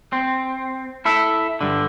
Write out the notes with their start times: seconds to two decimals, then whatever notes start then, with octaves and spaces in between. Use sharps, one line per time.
0.13 C4
1.05 E4 A4 E5
1.61 G2 D3